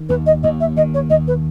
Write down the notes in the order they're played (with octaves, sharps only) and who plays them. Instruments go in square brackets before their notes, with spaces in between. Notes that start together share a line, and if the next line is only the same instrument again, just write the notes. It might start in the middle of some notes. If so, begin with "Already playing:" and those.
Already playing: [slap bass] D#3
[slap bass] D#2 [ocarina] B4
[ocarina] D#5
[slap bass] D#2 [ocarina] D#5
[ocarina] E5
[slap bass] D#3 [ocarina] D#5
[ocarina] C#5
[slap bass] D#2 [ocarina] D#5
[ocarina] B4